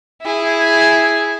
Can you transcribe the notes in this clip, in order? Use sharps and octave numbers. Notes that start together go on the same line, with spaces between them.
E4 G#4